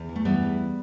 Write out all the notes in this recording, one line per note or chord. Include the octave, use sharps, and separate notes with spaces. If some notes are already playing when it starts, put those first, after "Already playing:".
Already playing: E2
E3
A3
E3 G3 B3
E2